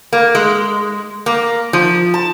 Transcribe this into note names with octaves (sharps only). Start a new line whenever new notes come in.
A#3
G#3
A#3
F3
A5